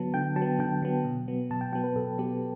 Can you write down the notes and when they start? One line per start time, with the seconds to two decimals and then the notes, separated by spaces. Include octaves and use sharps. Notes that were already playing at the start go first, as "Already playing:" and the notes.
Already playing: D3 F#3 B3 A5
0.14 D3 G5
0.36 F#3 A5
0.42 B3
0.59 D3 G5
0.82 F#3 B3
1.05 B2
1.28 F#3 B3
1.51 B2 A5
1.61 G5
1.72 F#3 B3 G5
1.84 B4
1.96 B2 A4
2.18 F#3 B3 G4